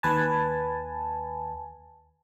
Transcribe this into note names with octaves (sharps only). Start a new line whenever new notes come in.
D#2 B4 G#5 A5